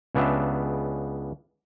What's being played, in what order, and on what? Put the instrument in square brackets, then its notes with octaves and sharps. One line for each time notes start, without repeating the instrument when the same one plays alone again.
[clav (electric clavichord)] C#2 C#3 B3 D4 G4 E5